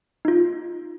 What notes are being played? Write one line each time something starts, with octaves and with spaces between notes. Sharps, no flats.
D#4 F4